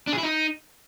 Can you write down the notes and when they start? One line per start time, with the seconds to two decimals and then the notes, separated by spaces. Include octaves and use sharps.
0.07 D4
0.13 G#4
0.18 E4
0.23 D#4